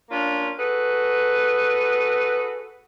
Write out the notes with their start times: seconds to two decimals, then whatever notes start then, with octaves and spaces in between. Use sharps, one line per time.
0.10 A#3 C#4 D4 F4
0.58 F#4 G#4 A4 B4